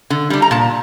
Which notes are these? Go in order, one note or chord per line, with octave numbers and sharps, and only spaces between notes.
D3
G3 D4
A#5
A#2 A5